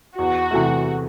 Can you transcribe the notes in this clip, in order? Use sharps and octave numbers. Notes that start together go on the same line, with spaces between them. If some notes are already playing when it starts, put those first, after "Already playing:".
E2 F#4
C3 E3 A3